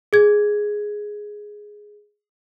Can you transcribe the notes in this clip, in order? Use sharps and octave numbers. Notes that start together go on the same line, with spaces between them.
G#4 G#6